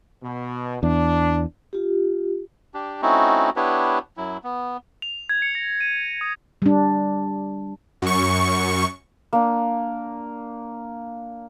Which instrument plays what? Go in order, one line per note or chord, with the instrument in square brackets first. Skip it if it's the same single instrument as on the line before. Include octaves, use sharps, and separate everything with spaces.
[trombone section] B2
[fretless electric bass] E2 [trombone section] D4
[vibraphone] F4 G4
[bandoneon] D4 G4
A3 C4 C#4 D#4 E4 F#4
B3 D4 E4 G4 B4 C#5
F#2 F#3 E4
B3
[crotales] F7
G#6
C#7
A#6
D#7
D#6
[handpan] G3 D4
[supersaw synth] F#2 C#6
[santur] A#3 D4